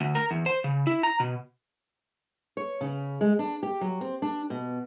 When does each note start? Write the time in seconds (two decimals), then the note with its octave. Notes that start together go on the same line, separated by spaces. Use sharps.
0.01 D2
0.15 A#4
0.31 E2
0.46 C5
0.64 C#3
0.87 E4
1.03 A#5
1.20 B2
2.57 C#5
2.81 C#3
3.21 G#3
3.39 D4
3.63 G4
3.81 F#3
4.01 C4
4.22 D4
4.50 B2